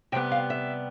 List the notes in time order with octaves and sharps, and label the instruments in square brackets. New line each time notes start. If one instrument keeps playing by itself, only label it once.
[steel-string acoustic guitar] C3 G5
G3 B3
F5
E5